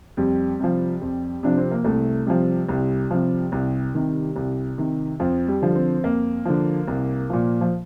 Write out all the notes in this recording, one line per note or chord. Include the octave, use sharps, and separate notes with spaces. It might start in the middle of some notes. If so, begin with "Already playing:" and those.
F2 G3
C3 F3
F2
C3 F3 D4
C4
A#3
C2 A3
C3 F3 G3
C2 G3
C3 F3
C2
C3 D#3
C2
C3 D#3
F2 F3
G3
D3 F3
C4
F2 A#3
D3 F3
C2
A#2 F3
F3